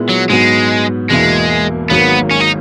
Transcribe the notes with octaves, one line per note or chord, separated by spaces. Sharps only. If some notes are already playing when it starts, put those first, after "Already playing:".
Already playing: A#2 G#3 B3 E4
F#3
G#2 F#3 G#3 B3 F#4
E1 E2 B2 G#3 A#3 E4
G#1 G#2 F#3 A#3 B3
C#4
D#4